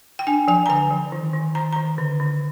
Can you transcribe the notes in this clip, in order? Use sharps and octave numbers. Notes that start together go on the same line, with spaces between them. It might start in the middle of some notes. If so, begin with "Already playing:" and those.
G5
D4 G#5
F3 G#5
A#5
D3 G#5
F3
D#3
D#3
D#3 A#5
D#3 A#5
D3
D3